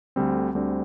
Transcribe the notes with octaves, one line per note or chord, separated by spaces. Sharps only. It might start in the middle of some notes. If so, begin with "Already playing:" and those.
D2 D3 G3 C4
D2 D3 G3 C4